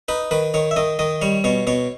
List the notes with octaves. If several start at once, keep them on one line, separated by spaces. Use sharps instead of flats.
D#4 B4
D#3 B4
D#3 C#5
E5
D#3 D#5
D#3 D#5
G3 C#5
B2 C#5
B2 C#5